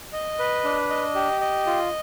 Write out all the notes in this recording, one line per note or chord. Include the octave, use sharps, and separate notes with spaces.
D#5
B4
D4
D#5
G4
D#5
F4